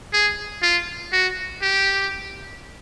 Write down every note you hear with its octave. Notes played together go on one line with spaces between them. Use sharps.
G#4
F4
F#4
G4